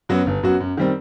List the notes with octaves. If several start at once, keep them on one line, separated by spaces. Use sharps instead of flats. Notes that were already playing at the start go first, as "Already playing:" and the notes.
F#2 F#3 B3 F#4
G1
F#2 F#3 B3 F#4
F#2
D#3 G3 C4